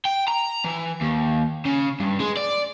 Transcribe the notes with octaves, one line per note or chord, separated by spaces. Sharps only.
G5
A#5
E3
D#2
C#3
G2
G#3
D5